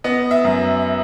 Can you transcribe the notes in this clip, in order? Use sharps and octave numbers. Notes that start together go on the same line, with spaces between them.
B3 D#5
E5
F#2